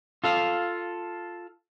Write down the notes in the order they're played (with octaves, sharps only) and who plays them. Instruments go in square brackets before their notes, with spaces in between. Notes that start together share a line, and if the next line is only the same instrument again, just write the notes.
[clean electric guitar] F4 A4 F5